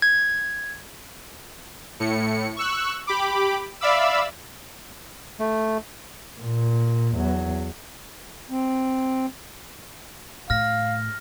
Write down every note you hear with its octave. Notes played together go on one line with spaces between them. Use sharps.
G#6
A2 C#7
C#6 E6 F#6
G4 B5 D6
D5 E5 F5 B5 D6 E6
A3
A#2
E2 F#3
C4
A2 F5 F6 A#6